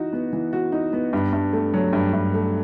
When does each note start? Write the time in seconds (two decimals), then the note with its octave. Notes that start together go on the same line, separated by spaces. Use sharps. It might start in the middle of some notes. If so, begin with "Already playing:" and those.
Already playing: E3 D#4 F#4
0.13 B3
0.33 E3
0.53 F#4
0.72 D#4
0.93 B3
1.13 G2
1.33 G2
1.53 A3
1.74 F#3
1.93 G2
2.13 G2
2.34 A3